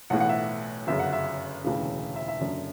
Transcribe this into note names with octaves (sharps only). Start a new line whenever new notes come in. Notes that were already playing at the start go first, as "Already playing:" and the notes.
B1 A2 E3 F#5
F#5
E5
G1 F#2 C#3 E5
F#5
E5
E1 D2 C#3 E3
E5
E5
F#1 F#2 D3